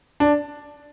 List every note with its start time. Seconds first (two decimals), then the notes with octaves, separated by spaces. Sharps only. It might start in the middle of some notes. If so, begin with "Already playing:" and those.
0.20 D4